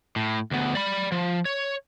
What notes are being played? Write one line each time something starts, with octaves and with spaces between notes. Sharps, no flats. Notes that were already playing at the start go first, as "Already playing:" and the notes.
A2
D2 B3
D5 B5
F3
C#5